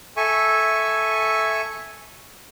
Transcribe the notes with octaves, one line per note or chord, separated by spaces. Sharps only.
A4 E5 G#5 C#6